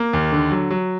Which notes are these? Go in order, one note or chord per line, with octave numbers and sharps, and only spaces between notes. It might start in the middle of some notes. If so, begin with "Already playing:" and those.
Already playing: A#3
D#2
D3
F#3
F#3